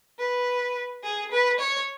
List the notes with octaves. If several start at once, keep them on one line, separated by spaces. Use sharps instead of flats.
B4
G#4
B4
C#5